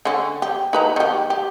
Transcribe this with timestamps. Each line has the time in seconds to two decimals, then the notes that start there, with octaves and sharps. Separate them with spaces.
0.05 D3 C#4
0.42 G4
0.73 D#4 B4 A#5
0.96 D#3 G4
1.30 G4